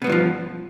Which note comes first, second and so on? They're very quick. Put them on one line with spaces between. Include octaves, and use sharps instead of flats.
B2 B3 G2 E3 F3